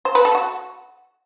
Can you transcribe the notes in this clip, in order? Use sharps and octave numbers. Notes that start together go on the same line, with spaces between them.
C5
B4
A4
F#4